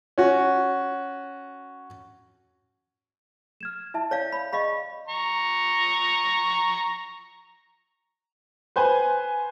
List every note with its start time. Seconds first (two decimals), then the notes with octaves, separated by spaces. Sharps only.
0.18 C#4 F#4
3.61 F6 G#6 E7
3.94 E4 E5 A5
4.11 C#5 D5 F5
4.32 B5
4.53 G#4 D#5 F5 B5 C#6
5.07 A#5 C#6
8.76 B4 C5 G#5